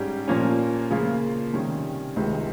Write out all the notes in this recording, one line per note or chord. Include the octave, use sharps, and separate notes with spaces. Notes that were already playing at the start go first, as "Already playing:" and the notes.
Already playing: G#2 G3 C#4 G4
A#2 F3 A#3 C#4
C#3 F3 A#3 F4
C3 D#3 G3 C#4
C#2 C3 D#3 G#3